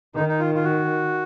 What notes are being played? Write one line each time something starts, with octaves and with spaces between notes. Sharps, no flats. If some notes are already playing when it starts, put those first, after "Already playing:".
D#3 D#4
D#4
F4
F4
F#4